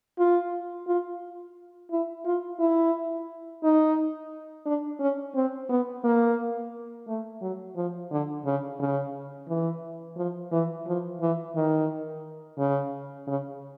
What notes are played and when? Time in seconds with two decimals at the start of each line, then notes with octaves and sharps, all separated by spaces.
0.18 F4
0.87 F4
1.91 E4
2.25 F4
2.60 E4
3.63 D#4
4.66 D4
5.00 C#4
5.35 C4
5.69 B3
6.04 A#3
7.07 A3
7.41 F#3
7.76 F3
8.11 D3
8.45 C#3
8.79 C#3
9.48 E3
10.17 F3
10.52 E3
10.87 F3
11.21 E3
11.55 D#3
12.58 C#3
13.27 C#3